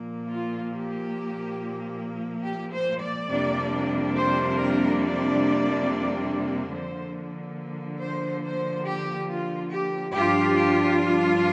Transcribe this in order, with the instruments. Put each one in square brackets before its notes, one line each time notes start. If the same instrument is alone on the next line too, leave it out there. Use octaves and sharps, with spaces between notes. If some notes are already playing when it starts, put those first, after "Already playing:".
Already playing: [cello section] A#2 F3 A#3
F4
G4
G4
C5
D5
F2 C3 G3 A#3 D4
C5
A#4
D5
D3 F3 A#3 C5
C5
C5
G4
F4
G4
G2 F3 D4 F4 G4
G4